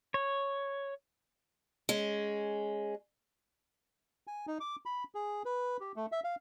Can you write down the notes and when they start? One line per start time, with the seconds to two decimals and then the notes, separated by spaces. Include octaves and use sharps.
0.14 C#5
1.89 G#3 C#4
4.27 G#5
4.47 D#4
4.60 D6
4.86 B5
5.15 G#4
5.45 B4
5.80 G4
5.96 A3
6.12 E5
6.24 F5